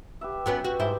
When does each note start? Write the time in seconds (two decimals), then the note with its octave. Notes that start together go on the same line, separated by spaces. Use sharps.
0.21 G4 B4 E5
0.46 F#3 B3 C#4 G5
0.64 F#4
0.79 G#2 E4 C5